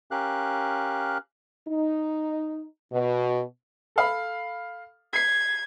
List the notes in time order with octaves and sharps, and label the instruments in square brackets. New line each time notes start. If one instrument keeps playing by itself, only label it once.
[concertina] C#4 G4 A#4 F5 F#6
[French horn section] D#4
B2
[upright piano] A4 F5 B5
[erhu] G#6 [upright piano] B6 C7